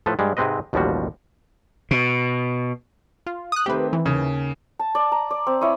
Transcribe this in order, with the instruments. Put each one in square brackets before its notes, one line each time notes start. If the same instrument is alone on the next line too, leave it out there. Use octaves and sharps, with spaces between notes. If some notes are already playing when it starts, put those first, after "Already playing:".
[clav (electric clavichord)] A2 F3 A4 B4
G2 G3 G#3
G#2 C3 G#3 C4 B4 D#5
A1 D#2 B2 F3 G3 F#4
[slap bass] B2
[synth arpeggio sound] F4
D#6 F#6
[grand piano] D#3 A3 C4 [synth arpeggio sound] G4 B4
[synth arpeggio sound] E3
[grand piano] D#2 C#3
[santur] A5
D5
A#5
D5
C4
E4 C#5 D#5